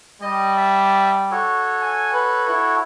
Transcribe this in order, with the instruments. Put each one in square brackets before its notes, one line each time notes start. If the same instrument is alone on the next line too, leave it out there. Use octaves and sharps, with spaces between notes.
[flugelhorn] G3 [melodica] D#5
[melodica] E5 A5
F#4 A4 C#5
[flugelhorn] G#5
B4
E4